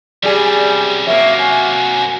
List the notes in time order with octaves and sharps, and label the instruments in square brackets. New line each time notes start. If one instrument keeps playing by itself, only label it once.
[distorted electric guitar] F#2 C3 [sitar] G3 G#4
[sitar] F#3 A#3 [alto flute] E5
[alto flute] G#5